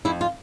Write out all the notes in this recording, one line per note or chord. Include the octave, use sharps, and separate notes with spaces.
F2 E4
F4